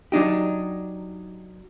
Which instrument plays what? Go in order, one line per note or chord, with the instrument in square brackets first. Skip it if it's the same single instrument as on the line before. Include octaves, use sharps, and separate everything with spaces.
[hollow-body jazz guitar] F#3 D4 D#4 G4